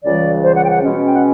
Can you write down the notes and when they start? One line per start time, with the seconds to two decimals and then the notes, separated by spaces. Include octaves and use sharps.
0.04 C#2 C#3 E3 G3 D5
0.43 C5
0.56 F#5
0.65 G5
0.70 F#5
0.83 B2 G#3 C#4
1.06 G5
1.14 F#5